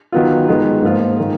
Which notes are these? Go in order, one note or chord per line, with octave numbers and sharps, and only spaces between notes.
D#3 F#3 B3 F4
D#3 G#3 B3
G#2 F3 A#3 F4
D#3 A#3